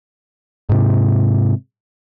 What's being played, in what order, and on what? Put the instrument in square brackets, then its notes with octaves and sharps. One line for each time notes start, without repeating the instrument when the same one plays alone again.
[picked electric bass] G#2 C3